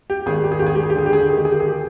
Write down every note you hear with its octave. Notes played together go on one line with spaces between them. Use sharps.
G4
G#1 G#4
G4
G#4
G#1 G4
G#4
G4
G#4
G4
D3 G#4
G4
G#4
G4
D#3 G#4
G4
G#4
G4
G#4
G4